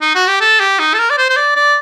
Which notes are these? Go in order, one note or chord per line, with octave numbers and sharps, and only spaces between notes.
D#4
F#4
G4
A4
G4
D#4
A4
A#4
D5
C5
C5
D5
D5